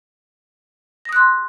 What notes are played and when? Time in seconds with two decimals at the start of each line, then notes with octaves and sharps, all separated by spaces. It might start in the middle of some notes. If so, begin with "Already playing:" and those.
1.05 A#6
1.09 D#6
1.13 F#6
1.16 C6